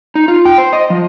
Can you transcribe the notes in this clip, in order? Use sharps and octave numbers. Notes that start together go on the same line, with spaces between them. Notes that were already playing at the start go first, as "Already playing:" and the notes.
D#4
F4
G5
C5
D#5
F3